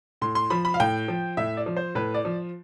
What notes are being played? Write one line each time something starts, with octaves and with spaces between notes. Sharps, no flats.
A2 C6
C6
F3 B5
B5
F5
A2 G5
F3
A2 E5
D5
F3
C5
A2 B4
D5
F3